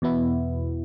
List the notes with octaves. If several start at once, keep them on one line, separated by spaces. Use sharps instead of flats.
E2 B2 B3 E4